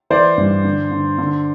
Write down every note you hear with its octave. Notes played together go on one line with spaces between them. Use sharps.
E3 C5 D5
G2
D3
D3
D3